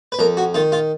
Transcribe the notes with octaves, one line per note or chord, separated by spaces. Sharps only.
B4
F2 A#4
F#4
D#3 F4
F4